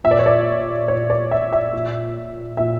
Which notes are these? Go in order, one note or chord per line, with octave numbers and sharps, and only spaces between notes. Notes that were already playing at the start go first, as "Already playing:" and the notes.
A#2 E5
D5
C#5
D5
A#2 C#5
D5
E5
E5
A#2
A#2 E5